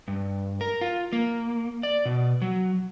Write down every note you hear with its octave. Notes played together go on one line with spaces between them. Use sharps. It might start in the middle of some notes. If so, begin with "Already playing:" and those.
G2
A#4
F4
A#3
D5
B2
F#3